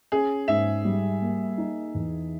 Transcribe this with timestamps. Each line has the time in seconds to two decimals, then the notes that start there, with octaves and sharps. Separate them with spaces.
0.12 C#4 G#4
0.48 G#2 E5
0.85 G3
1.21 A#3
1.58 D#4
1.95 E2